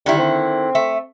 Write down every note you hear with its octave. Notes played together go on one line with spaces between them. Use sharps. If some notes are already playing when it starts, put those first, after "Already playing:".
D3 D#3 G3 E4
C4
A3 E5